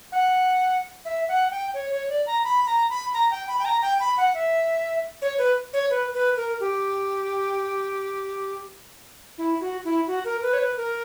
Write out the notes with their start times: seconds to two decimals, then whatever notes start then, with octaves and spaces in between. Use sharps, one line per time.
0.12 F#5
1.05 E5
1.28 F#5
1.51 G5
1.74 C#5
1.91 C#5
2.09 D5
2.27 A#5
2.44 B5
2.67 A#5
2.90 B5
3.14 A#5
3.31 G5
3.48 B5
3.59 G5
3.65 A#5
3.82 G5
4.00 B5
4.17 F#5
4.34 E5
5.22 C#5
5.38 B4
5.73 C#5
5.90 B4
6.14 B4
6.37 A#4
6.60 G4
9.38 E4
9.61 F#4
9.85 E4
10.07 F#4
10.25 A#4
10.42 B4
10.53 C#5
10.59 B4
10.77 A#4